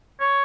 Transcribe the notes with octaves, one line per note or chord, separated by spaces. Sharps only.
C#5